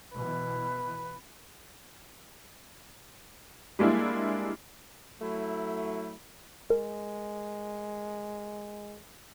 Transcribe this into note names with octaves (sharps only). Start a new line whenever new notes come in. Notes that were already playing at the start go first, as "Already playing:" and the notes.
B2 E3 B4
G3 G#3 A#3 D4 E4
F#3 A3 E4
G#3 A#4